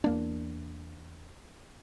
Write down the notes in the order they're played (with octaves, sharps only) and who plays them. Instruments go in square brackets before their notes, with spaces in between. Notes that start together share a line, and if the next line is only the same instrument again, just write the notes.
[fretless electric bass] E2 A#3 D4